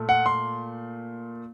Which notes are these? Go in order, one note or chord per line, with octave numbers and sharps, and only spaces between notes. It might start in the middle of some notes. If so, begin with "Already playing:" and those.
Already playing: A#2 A3
F#5
C6